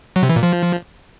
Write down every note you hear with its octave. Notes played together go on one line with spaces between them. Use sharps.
F#3
C3
E3
A#2
F3